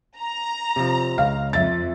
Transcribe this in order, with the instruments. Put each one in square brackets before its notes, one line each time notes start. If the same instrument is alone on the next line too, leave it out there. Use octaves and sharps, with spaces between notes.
[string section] A#5
[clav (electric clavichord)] C3 F3
[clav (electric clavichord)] C#2 [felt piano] F5
[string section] F2 [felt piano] E5 A6